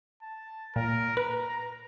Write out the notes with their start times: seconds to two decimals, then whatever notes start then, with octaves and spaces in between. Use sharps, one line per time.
0.22 A5
0.76 A#2 A#4
1.17 B4 A#5